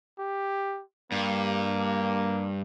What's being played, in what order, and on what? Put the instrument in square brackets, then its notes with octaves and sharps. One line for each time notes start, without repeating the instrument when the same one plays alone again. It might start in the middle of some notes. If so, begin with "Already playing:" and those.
[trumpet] G4
[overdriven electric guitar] G2 [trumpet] A#3